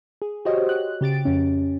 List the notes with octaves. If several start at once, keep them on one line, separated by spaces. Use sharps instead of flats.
G#4
F#4 G4 C5 C#5 D#5
F#6
C#3 G4 A6 D7
F2 C#4